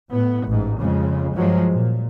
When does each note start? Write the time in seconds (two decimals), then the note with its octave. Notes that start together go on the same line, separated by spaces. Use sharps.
0.11 A2 B3
0.47 A1 G#2
0.78 F2 C#3 G#3
1.35 G2 F3 F#3 G#3
1.71 A#2